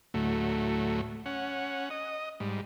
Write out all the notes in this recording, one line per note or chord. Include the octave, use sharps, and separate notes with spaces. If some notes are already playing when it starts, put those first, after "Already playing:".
D2 A2 F#3 A3
C#4 F#5
D#5
G#2 G3